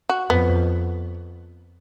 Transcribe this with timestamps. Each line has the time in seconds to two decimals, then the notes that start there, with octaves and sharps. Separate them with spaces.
0.09 F#4
0.30 F2 B3